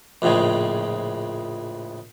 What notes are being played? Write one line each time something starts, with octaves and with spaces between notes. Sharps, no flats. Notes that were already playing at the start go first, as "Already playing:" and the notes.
A#1 F2 A2 C#3 G#3